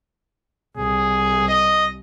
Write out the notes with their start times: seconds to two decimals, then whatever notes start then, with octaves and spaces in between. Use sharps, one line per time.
0.77 C2 G#4
1.48 D#5